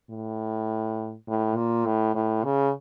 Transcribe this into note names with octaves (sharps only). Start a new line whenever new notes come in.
A2
A2
A#2
A2
A2
C#3